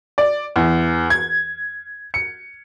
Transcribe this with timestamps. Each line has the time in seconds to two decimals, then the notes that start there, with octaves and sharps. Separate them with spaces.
0.18 D5
0.56 E2
1.10 G#6
2.14 C#7